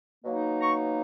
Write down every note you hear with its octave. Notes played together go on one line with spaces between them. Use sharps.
B2 F#3 A#3 D#4
A#5 C#6